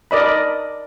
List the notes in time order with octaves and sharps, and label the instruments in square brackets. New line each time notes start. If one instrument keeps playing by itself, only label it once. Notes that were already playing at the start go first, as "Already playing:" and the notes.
[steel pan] A#4 D5 D#5 B5